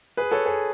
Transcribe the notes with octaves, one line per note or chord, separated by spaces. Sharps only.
G#4 B4
A4 C#5
G#4 B4